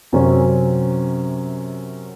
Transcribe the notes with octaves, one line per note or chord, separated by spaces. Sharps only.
F#2 C3 F#3 C4 C#4